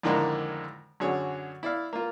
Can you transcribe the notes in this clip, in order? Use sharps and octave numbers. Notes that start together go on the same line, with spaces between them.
F2 A2 D3 D#3 G#3 A#3
F#2 D3 F#4 G#4 C#5
E4 D5 F5
A#3 F4